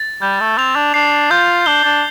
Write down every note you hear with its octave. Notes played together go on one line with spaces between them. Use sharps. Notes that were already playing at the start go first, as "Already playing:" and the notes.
Already playing: A6
G3 G6
A3
C4 F7
D4
D4 C7
F4 G6
D4 G7
D4